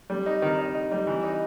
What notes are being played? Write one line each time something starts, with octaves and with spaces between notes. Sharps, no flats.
G3
D#4
D#3
D#4
D#4
G3
E3
D#4